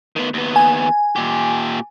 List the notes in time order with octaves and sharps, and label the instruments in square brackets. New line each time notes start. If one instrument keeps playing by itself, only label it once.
[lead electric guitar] D#3 B3
D#2 B3
[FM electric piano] G#5
[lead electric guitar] A#2 G4